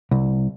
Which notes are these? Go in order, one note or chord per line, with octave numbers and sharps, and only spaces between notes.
C2